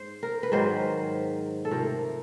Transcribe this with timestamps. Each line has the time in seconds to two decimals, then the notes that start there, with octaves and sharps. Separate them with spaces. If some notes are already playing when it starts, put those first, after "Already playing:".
Already playing: G#2 C5
0.23 A#4
0.43 B4
0.52 G#2 D#3 F#3 C5
1.65 A4
1.71 C3 F3 A3 A#4